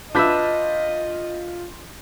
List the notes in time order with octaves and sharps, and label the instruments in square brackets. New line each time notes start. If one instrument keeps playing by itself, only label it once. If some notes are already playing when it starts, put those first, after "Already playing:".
[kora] D4 B4 E5 [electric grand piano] F4 G6 B6 [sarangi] D#5